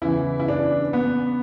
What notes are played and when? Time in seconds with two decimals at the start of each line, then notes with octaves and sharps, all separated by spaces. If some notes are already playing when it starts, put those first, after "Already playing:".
0.02 E2 C#3 E3 E4
0.40 E4
0.48 D4
0.93 B3